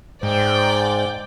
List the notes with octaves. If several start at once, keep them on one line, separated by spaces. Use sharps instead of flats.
G#2 C5 D5 G5